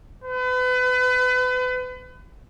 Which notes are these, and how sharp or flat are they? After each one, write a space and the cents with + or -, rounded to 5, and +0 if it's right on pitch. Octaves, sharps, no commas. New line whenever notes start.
B4 +35